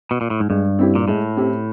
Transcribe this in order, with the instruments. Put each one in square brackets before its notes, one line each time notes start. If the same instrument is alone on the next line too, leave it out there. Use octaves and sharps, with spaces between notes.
[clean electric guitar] B2
A#2
A2
G#2
[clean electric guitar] G2 [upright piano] G#3
[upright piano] C4 E4 G4
[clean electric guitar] A#2
[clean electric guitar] A2 [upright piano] G#3
[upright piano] C4 E4 G4